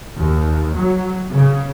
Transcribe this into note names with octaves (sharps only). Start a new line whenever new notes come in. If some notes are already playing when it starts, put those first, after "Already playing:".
D#2
F#3
C#3